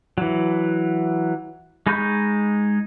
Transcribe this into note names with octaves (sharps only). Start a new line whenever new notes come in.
E3 F#3
G#3 D#4 B5 C#6 G6